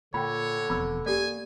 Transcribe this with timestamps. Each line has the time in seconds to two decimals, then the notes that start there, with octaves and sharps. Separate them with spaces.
0.14 A#2 D3 C#5 G5 B5
0.70 E1 F2 B3 B5 E6
1.06 A#3 G4 A4 D5 G#5